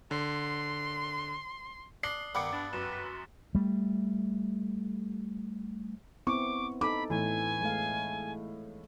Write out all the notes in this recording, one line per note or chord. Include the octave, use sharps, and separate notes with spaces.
D3 C6
D4 D#6 C7 F#7 G7
G2 D#3 G3 B3 B5 D6 E6 C#7
D4 F#6 A6
F#2 B4 E7
B6
C6
G3 A3
B3 C4 E4 C#6 D6
D#4 A4 B5 D6
A2 E3 G#5
G#3 A3 F5